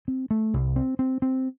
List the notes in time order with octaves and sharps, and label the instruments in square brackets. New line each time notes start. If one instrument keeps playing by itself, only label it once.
[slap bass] C4
A3
C2
C4
C4
C4